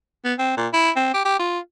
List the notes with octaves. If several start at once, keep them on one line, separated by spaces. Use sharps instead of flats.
B3
C4
A#2
E4
C4
G4
G4
F4